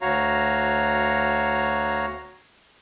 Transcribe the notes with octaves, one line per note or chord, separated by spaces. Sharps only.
D2 F#4 C#5 F5 A#5